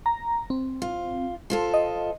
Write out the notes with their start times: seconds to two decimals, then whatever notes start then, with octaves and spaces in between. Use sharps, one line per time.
0.06 A#5
0.50 C4
0.82 F4
1.50 F3 F4 A4
1.74 D#5